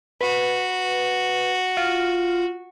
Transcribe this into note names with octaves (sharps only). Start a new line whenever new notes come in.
F#4 B4
F4